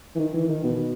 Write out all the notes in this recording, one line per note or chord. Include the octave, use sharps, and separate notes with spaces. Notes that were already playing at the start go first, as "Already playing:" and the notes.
E3
D#3
E3
D#3
B2